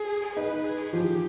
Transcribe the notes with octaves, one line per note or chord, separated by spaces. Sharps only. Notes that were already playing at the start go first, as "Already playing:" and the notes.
Already playing: G#4
D#4 B4
G#4
F3 G4